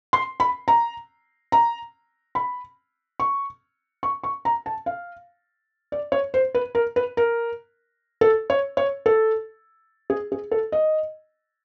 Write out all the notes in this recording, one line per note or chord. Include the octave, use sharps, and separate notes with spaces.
C6
B5
A#5
A#5
B5
C#6
C#6
C#6
A#5
A5
F5
D5
C#5
C5
B4
A#4
B4
A#4
A4
C#5
C#5
A4
G#4
G#4
A4
D#5